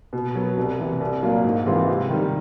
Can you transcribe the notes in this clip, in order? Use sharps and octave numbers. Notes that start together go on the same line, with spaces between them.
B2
F#3 B3
C2
C3 E3
C2
A#2 F#3 A#3 D4
G#2
E3 G#3 C4 F4
C3
D#3 G3